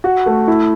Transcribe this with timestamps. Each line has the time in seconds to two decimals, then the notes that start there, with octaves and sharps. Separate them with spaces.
0.04 F#4
0.26 A3
0.48 E4